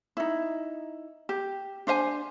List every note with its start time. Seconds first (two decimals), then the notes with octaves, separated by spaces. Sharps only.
0.17 D#4 E4
1.29 G4
1.87 D4 C5 E5 G#5